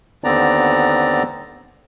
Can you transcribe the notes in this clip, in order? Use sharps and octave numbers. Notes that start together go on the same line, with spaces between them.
D#2 D3 B3 C4 D5 A#5